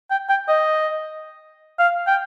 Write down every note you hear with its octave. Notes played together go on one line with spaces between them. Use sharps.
G5
G5
D#5
F5
G5